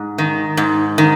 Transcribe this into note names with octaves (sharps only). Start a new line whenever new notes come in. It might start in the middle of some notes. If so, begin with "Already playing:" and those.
Already playing: G#2
D#3
G#2
D#3